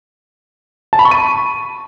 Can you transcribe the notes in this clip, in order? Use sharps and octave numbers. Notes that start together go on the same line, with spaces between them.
A5
B5
C#6
D#7